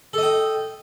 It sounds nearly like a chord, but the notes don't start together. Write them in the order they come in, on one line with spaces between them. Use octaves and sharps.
A4 D#5 G5